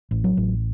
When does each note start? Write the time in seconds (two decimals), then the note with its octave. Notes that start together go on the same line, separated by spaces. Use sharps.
0.11 A1
0.24 F#3
0.37 A1